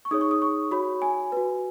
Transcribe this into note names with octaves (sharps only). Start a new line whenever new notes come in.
C#6
D#4 G#4 C#5 D#6
C#6
D#6
C#6
F#4 C#5 B5
G#5
F#4 B4